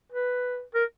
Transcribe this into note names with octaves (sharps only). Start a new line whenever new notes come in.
B4
A#4